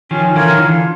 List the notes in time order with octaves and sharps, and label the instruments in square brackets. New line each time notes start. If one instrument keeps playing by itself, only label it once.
[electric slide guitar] D#3 F3 [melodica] C#4
[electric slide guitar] D3 E3 [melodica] F4 A#4 C#5
[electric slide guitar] D#3
[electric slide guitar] D3 E3 [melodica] F4